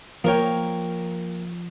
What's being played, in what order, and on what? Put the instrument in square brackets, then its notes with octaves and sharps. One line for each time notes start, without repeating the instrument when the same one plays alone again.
[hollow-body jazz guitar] F3 C#5 [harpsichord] A#3 A#4 G5